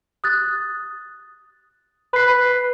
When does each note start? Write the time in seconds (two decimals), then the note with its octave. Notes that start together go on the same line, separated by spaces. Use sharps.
0.24 D#6 F#6 A6
2.13 B4 B5 C7